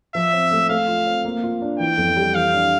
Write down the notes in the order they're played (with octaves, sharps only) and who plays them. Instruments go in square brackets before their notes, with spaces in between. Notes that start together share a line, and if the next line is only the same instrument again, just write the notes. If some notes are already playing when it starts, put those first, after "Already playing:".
[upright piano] F3 [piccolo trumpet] E5
[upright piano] C4
A3
[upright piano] A3 [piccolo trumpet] F5
[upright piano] F4
C4
A#3
F4
D4
[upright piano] E3 [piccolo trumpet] G5
[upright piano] F2
G3
[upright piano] E3 [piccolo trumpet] F5
[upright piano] D4